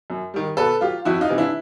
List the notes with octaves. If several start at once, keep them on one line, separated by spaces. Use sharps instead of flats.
F#2
D#3 G3
B2 A4 B4
F#3 F4 G4
F2 E4 F#4
D#4 F4
C3 E3 G3
D4 E4